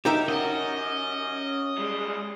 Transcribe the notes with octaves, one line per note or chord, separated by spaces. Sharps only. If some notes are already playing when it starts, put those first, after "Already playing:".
D#4 G4 A#4 E5
C#4 F#4 D#5
G3 G#3